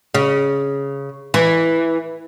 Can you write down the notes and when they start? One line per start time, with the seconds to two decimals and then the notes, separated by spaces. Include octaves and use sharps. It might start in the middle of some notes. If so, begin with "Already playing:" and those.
0.14 C#3
1.34 E3